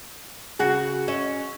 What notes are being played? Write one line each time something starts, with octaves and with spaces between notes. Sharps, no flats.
C#3 F#4 G#4
C#4 E5